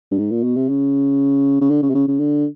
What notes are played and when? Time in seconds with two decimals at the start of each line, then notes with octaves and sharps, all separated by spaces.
0.11 G2
0.18 G#2
0.31 A#2
0.43 B2
0.56 C3
0.69 C#3
1.61 C#3
1.70 D3
1.82 C#3
1.90 C3
1.95 C#3
2.08 C#3
2.20 D3